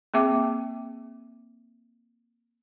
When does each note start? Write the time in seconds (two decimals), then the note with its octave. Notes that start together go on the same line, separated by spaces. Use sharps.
0.14 A#3 C4 G#4 E5 G5 D6